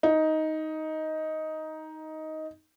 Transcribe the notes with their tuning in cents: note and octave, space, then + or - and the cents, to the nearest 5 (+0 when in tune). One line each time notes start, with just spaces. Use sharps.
D#4 +10